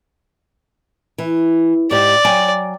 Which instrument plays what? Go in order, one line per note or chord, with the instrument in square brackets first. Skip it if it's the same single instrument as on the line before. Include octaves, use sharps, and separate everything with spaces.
[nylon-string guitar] E3
[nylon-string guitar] G#2 G4 [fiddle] D5
[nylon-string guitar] F#3 G5 G#5